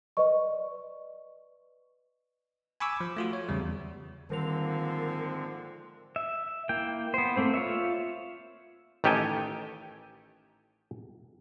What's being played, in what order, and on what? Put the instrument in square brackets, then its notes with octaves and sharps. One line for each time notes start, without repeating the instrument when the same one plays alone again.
[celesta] B4 D5 D#5 C#6
[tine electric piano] G#5 B5 C#6 D6 E6
F3
A3 F4 F#4
C#5
E2 C#3 G3
[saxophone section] G#2 F3 [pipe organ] D3 C4 [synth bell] D#3 F7 [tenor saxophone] A#3
[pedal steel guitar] E5
A#3 E4 G5
B3 C5
A3 A#3 C4 C5
F4 C#5 E5
[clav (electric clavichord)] A1 D#3 G4 A4 G5 G#5